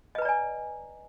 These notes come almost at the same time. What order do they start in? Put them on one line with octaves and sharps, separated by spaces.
D#5 B4 A#5 D5 G#5